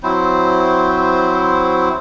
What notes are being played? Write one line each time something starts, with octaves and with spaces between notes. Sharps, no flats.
F#3 C4 E4 C5